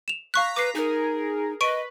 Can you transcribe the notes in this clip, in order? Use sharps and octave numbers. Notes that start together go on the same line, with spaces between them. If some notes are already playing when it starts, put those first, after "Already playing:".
E7 F7
F5 A#5 C#6 F#6 B6
B4 D6 C7
D#4 G#4 A#4
B4 D#5 C#6 D7 D#7